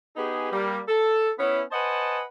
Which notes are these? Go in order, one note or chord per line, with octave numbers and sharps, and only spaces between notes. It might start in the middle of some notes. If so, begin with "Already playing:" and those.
B3 D#4 G4 G#4
G3 A#3
A4
B3 C#4 E4
B4 C5 D#5 F#5 G#5 A5